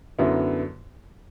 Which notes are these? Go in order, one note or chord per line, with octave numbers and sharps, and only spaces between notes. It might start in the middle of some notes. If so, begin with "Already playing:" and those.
F#2 D3 F#3 B3 E4